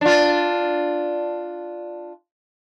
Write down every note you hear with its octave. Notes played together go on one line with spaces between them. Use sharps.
D4 F4